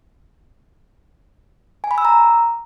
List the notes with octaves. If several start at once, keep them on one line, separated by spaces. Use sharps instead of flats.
G#5
B5
E6
A#5